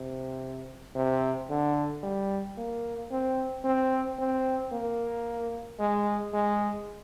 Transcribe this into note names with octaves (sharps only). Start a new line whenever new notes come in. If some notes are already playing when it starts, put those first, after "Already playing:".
Already playing: C3
C3
D3
G3
A#3
C4
C4
C4
A#3
G#3
G#3